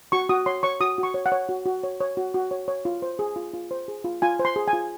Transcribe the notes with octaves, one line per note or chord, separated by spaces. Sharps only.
F#4 C#6
F#4 D#6
C#5 C6
C#5 C#6
F#4 D#6
F#4
C#6
C#5
F#5
C#5
F#4
F#4
C#5
C#5
F#4
F#4
C#5
C#5
F4
C5
G#4
F4
F4
C5
G#4
F4
F4 G#5
C5
C6
G#4
G#5
F4